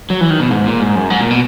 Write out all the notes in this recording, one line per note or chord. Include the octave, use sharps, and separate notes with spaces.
F#3
E3
D#3
B2
G#2
A#2
G#2
F#2
G#2
A#2
B2